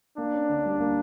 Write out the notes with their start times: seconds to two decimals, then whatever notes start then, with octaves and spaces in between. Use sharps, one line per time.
0.17 A#3 D4
0.33 C#4
0.49 D3
0.65 G3
0.80 A#3